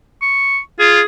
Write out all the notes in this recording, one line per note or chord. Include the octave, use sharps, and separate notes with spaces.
C#6
F4 G#4